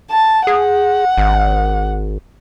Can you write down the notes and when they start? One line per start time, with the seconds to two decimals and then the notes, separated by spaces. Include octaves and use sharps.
0.11 A5
0.47 G#4 F#5
1.18 G#1